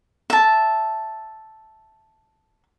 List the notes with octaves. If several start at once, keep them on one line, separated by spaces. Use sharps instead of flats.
E5 A5